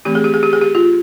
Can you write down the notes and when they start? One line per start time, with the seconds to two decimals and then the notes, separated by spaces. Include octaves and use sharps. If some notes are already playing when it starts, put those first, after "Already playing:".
0.05 E3 A3 C4 G4
0.15 G#4
0.24 G4
0.34 G#4
0.43 G4
0.53 G#4
0.62 G4
0.75 F4